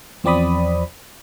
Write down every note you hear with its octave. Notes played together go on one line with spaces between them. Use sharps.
E2 F3 C4 D5 B5 D#6